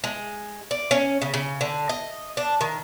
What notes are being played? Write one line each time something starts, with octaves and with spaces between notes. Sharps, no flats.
G#3
D5
C#4
C#3
C#3
D3
D#5
D4
D#3